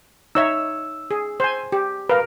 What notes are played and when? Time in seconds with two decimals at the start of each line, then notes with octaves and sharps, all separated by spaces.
0.35 D#4 C#5 E5 E6
1.11 G#4
1.40 C5 G#5
1.72 G4
2.09 A#4 B4 F5